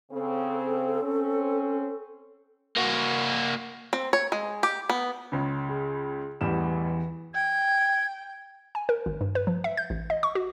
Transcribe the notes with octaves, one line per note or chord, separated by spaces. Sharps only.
C#3 C4 A4
C4 C#4
A#3 F#4
C4
C#5
G#3
G4
B3
C#2 C#3
G#4
A1 E2 A2 G3 E7
G5 G#6
G#5
A#4
G#1
G2
B4
F3
E5
G6
A1
D#5
C#6
F#4